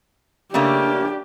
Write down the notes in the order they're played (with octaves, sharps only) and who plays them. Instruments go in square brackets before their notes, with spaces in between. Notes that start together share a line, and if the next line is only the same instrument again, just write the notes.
[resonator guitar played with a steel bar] C#3 A3 A#3 [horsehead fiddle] D4 G4